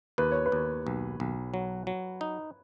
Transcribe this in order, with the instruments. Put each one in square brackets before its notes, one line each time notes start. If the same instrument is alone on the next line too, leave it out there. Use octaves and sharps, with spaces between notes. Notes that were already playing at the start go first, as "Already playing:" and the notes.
[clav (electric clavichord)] D#2 [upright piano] B4
[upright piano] C#5
B4
[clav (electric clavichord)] D#2
B1
B1
F#3
F#3
D#4